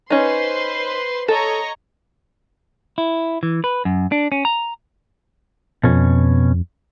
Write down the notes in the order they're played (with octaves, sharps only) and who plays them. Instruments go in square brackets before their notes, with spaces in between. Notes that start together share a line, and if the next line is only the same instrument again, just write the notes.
[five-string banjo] C#4 D#4 [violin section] B4 C5 C6
[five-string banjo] A4 [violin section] C#5 D#5 A#5
[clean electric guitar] E4
E3
B4
F#2
D4
C#4
A#5
[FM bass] F2 [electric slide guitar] B2 C#4